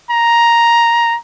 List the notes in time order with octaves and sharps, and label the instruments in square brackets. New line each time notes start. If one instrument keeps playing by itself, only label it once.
[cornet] A#5